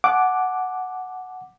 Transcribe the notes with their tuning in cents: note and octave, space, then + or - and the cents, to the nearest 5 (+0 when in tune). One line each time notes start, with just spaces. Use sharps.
F#5 +0 A5 -40 D6 +0